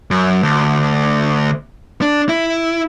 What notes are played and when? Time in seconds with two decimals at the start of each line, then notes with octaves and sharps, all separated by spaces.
0.11 F#2
0.43 D2
2.02 D4
2.29 E4